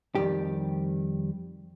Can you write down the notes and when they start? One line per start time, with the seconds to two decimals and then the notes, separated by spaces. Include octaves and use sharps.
0.15 F2 D#3 G3 G4